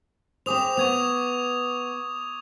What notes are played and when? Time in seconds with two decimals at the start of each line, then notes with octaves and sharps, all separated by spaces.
0.46 C4 G#4 C5 D6 D#6 F7
0.77 B3 C#6 G#6 F7